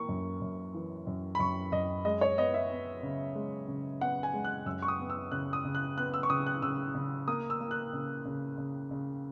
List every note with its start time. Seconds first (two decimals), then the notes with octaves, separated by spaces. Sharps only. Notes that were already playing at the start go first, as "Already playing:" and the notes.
Already playing: E3 A#3 C#6
0.09 F#2
0.42 F#2
0.74 E3
1.07 F#2
1.35 B5
1.39 F#2 C#6
1.72 F#2 D#5
2.05 G#3 D#5
2.21 C#5
2.38 B3 D#5
2.54 E5
2.70 B3
3.03 C#3
3.36 G#3
3.68 C#3
4.01 B3 F#5
4.23 G#5
4.34 G#3
4.45 F#6
4.66 F#2 E6
4.82 C#6
4.88 D#6
4.99 B3
5.10 E6
5.32 C#3 F#6
5.53 D#6
5.65 C#3
5.75 F#6
5.97 B3 F#6
6.14 E6
6.23 C#6
6.30 C#3 D#6
6.46 F#6
6.62 C#3 E6
6.95 C#3
7.28 A#3 D#6
7.50 E6
7.61 A#3
7.71 F#6
7.93 C#3
8.25 C#3
8.58 C#3
8.91 C#3